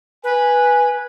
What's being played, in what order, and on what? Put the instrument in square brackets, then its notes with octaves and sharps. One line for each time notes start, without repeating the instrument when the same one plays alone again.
[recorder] B4 [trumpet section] G#5